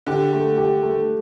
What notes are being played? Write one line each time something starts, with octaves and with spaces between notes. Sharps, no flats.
D3 G4
A3
G4
A3